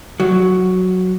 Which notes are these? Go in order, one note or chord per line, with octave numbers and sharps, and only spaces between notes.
F#3